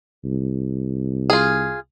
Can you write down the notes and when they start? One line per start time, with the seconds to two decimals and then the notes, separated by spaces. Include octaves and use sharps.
0.24 C2
1.30 F4 G#4